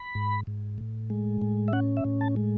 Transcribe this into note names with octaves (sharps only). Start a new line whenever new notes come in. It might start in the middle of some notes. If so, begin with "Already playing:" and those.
Already playing: B5
G#2
G#2
A2
G#3
A2
E5
C#4 F#5
E5
A2
A5
G#3